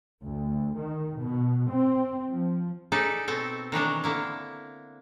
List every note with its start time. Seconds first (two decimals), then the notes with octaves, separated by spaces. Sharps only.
0.24 D2
0.77 D#3
1.19 B2
1.71 C4
2.29 F3
2.92 D#4 G#4 A4 B4 D5
3.28 B2 C4 A4
3.72 D#3 E3 F#3 D4
4.04 D3 A#3 E4